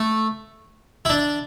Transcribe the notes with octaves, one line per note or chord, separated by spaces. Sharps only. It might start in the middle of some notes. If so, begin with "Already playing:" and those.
Already playing: A3
E4
D4